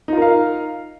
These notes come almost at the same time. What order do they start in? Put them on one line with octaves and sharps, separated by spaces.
D#4 F4 A#4 F5